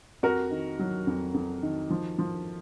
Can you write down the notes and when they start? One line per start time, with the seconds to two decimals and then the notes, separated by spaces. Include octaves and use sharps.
0.23 F2 F#4 A#4
0.51 D#3
0.79 F#3
1.07 F2
1.34 F2
1.62 D#3
1.90 F3
2.19 F3